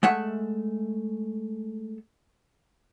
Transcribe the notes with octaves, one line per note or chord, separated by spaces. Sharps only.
G#3 A3 E5 F#5